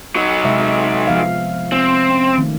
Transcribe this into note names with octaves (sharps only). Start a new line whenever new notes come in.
F#3 D#4
C3 G#3 E5
F3 B3 F5
C4
C#4
D#3 A3